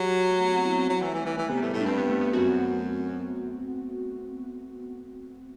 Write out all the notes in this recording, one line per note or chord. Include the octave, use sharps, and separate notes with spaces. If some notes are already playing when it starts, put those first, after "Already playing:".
Already playing: F#3 G4
A3
B3
C4
E4
C4
F#3
E3 A3
E3 G3
E3 G3
E3 A3
C3 B3
G3
A2 A3
A2 A3
D4
G2 C4
B3
A3
B3
F#2 F#4